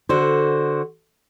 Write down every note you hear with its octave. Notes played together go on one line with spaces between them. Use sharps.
D3 F#4 C5